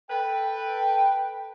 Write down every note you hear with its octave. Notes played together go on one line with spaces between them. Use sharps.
A4 B4 G5